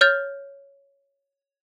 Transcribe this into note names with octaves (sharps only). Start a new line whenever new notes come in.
C#5 F6 G6 A6 F7